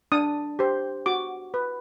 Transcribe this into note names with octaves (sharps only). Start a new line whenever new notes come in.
D4 D#6
G4 C5
F#4 D6
B4